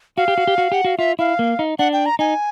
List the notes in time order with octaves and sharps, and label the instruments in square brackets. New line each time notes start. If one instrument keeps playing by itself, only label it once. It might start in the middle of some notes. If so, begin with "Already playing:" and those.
[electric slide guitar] F#4 [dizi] F5
[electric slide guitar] G4
F#4
G4
F#4
[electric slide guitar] G4 [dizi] F#5
[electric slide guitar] F#4 [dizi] F5
[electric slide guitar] F4 [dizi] E5
[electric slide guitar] E4 [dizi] F5
[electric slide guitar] A#3
D#4
[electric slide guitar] D4 [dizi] F#5
[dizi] G5
A#5
[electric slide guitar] D#4 [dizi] G#5